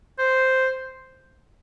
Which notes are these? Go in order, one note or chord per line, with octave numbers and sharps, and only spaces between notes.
C5